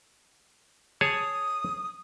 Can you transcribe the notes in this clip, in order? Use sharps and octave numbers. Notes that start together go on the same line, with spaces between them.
G#4 C#5 A5 D#6